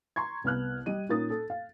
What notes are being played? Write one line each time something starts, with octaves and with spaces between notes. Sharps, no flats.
A#5 C6 C#6 G#6
C2 B3 F6 F#6
G3 D#5 D#7
A#2 C#4 D#4 A#4 D#6 A6
A4
F5